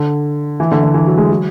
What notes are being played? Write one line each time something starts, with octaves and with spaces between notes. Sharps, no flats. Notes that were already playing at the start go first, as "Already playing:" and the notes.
Already playing: D3
E3
D3
D3
E3
F#3
G#3
F#3